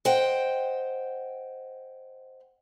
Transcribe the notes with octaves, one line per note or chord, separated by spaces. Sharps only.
C5 D#5 F#5 G5